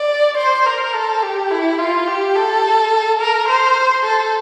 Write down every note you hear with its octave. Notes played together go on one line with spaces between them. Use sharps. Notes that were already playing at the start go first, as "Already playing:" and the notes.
Already playing: D5
C5
A#4
A4
G4
E4
F4
G4
A4
A#4
C5
A4